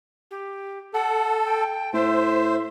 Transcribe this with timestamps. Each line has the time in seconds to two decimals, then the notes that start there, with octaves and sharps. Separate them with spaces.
0.31 G4
0.94 A4 F#5
1.45 G5
1.94 A2 C5 E5